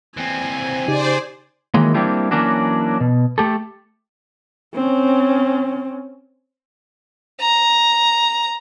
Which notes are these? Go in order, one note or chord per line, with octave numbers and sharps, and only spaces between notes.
E3 C4 G#5
C#3 D#4 G4 G#4 C5 D5
D#3 E3 F#3 G#3 A#3
G3 A#3 C4 D4 E4 G4
E3 F#3 A#3 C#4 D4 F#4
B2
A3 G4 A4
C4 C#4
A#5